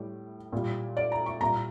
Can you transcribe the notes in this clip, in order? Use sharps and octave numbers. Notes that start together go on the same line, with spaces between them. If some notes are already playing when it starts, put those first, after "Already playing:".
Already playing: A2 G3
A#2 G3
D5
A#5
C#6
A#2 G3 A#5